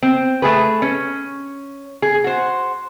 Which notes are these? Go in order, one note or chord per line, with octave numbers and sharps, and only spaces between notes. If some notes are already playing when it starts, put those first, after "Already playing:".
C4
A3 G#4 B4
C#4
G#4
F#4 C5